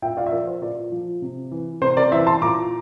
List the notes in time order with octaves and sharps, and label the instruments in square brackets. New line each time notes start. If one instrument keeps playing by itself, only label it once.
[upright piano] A#2 E5 G5
D5 F5
E5
F3 A#4 D5
C5
A#2 A#4 D5
F3
C3
E3
C3 C5
A#4 D5
E3 C5 E5
A5 C6
A#2 A#5 D6